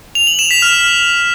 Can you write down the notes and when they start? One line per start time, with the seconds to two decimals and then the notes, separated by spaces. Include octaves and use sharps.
0.15 F7
0.27 F#7
0.39 E7
0.51 B6
0.62 F6